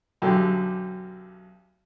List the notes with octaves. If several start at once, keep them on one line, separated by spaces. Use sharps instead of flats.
B1 F#2 D3 G4 A4 C6